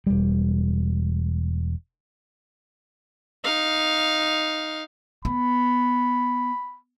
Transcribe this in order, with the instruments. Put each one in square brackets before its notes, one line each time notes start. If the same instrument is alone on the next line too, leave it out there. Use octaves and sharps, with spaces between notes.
[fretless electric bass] E1 G3
[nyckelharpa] D#4 F5
[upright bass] B3 [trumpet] B5